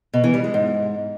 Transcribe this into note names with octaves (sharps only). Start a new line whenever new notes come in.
B2
E3
G3
G#3
G#2